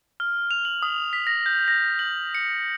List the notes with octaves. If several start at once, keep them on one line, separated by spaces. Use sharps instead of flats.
F6
F7
F#7
D#6
B6
A#6
G6
A#6
F#7
C#7